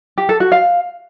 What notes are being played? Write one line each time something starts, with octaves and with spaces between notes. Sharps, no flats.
G4
A4
F#4
F5